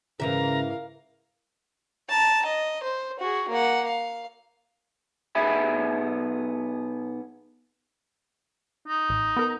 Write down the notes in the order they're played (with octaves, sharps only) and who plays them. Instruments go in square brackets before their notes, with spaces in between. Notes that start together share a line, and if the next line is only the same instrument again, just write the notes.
[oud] G#2 E3 E5 [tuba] C#3 [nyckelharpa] A#4 F5 [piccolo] A#5
[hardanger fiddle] A5 A#5
D#5
C5
F#4 G#4
A#3 F#5
F5
[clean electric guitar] B2 B3 D#4 G#4 E5 B5
[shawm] D#4
[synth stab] A1
B3 A#4